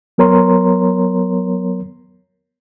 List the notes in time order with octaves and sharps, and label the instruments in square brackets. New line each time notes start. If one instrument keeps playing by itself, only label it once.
[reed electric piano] F#3 B3 A#4 C#5 A#5 C6